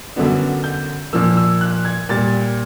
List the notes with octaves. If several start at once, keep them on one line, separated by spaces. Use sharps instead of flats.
F#2 D3 F#3 B3 D4
G6
A#2 F3 A#3 E6
E6
F#6
G#6
A#2 G3 A6